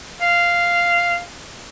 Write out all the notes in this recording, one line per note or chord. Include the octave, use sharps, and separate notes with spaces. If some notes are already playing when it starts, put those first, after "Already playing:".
F5